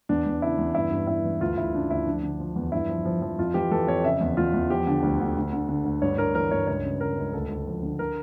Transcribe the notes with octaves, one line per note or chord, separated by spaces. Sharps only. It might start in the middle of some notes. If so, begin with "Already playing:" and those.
E2 D4
E2
C#3 E4
E2
G2 E4
G2
G2 E4
E3
D2 F4
D2 E4
C#3 D4
D2 E4
F3 D4
D3
F3
E2
G2 E4
F3
F3
F3
F2 F4
E3 G4
E3 A4
F2 C#5
C#3 E5
E2
E2 F4
E2
F3 G4
D3
D2
D2
D2
D3
D3
D2
G2 C#5
G2 A#4
E3 A#4
G2 C#5
C#2 C#5
C#3
C#2 A#4
C#2
D2 A4
D2
F3
D3
A#4